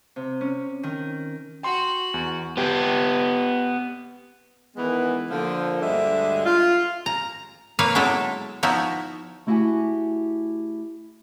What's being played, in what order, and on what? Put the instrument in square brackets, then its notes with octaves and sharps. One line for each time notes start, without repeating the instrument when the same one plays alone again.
[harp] C3
C#4
D#3
[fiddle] F#4 [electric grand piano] G5 C6
[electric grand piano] E2
[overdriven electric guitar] B3 G4
[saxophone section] D#3 E3 G#3 B3
D3 F3 A#3
D2 G2 D3 G#3 D#5 E5
F4
[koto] A#5
A#3 B4 C#5 F5
F#3 G#3 B3 E4 A4
F3 B3 D#4 E4 F#4
[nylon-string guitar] A3 E4 F#4 G4 F#5 G#5